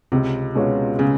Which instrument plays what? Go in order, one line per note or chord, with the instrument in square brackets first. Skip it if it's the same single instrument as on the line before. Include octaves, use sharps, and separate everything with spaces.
[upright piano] C#2 [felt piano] C3
[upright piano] B2 G#3 C#4 F4
[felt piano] C#3